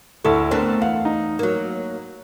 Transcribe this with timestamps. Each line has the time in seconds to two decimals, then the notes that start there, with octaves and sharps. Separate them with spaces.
0.25 D2 E4 A4 C#6
0.51 A3 B3 C4 D4 A#4
0.82 E2 F5 F#5
1.05 D#4
1.39 F#3 A#3